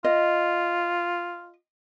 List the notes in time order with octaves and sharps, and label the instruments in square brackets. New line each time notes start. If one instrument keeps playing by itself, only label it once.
[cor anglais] F4 [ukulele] D#5